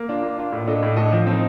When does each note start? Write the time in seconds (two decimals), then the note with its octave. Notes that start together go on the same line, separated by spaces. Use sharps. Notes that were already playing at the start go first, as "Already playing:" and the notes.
Already playing: A#3
0.09 D4 F4
0.23 A#3
0.38 D4 F4
0.52 A2
0.67 A3 D4 A4 D#5
0.83 A2
0.96 A3 D4 A4 D#5
1.12 F3
1.27 C4 D#4